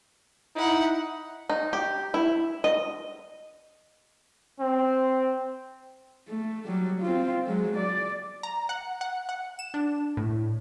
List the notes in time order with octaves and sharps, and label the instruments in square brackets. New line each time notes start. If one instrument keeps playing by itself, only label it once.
[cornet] D#4 [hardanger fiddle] E4 F#5
[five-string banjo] D#4
G4
E4
D#5
[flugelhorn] C4
[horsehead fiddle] A3
F#3 G3
C4 F4
F#3 G#3
D5
[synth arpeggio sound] A#5
F#5
F#5
F#5
E7
D4
A2